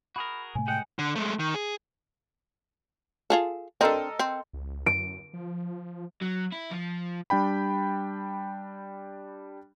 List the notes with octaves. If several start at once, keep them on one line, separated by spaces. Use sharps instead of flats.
F#4 G#4 A#4 B5
A2 C3 A3 G#5
G2 G#3 F#5 G5
D3
G#3 A3
D#3
G#4
F4 G#4 A4
C4 D4 A4 A#4 D#5
C4
C#2
F#2 D7
F3
F#3
E4
F3
G3 D4 G5 B5